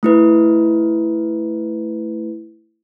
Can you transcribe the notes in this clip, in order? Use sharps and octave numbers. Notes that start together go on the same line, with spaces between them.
A3 E4 B4